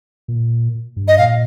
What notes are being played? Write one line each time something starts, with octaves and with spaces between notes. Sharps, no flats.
A#2
G2
D#5
A#2 F5